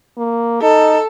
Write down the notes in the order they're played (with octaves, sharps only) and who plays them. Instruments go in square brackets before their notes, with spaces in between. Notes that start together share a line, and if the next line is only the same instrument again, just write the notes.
[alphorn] A#3
[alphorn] D#4 [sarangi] A4